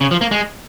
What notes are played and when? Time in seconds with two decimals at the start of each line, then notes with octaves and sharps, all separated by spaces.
0.01 C#3
0.11 F3
0.21 A#3
0.31 G#3